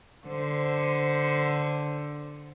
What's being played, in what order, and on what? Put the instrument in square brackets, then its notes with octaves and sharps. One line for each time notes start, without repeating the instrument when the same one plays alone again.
[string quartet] D3 C5